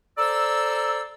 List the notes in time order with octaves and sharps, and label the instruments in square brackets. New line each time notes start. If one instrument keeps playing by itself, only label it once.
[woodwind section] A4 C5 D5 A#5 E6